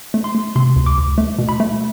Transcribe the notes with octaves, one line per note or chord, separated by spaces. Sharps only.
A3
C6
A3
C3 C6
D2
D6
D2
A3
B2
B5
A3